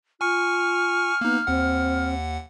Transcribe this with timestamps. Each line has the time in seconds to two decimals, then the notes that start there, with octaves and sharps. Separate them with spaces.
0.21 F4 G#5 C#6 F6 C#7
1.21 A#3 B3 D#4
1.47 D#2 C4 F#5